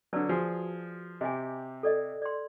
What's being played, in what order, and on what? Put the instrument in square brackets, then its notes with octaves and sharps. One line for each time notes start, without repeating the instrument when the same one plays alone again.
[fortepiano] D3 F#3 [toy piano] B4 D5 A5
[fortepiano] F3 G#4 [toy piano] F#4
[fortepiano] C3 G4 [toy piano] D#5 G#5
[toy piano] A4 D5 D#5
D5 C6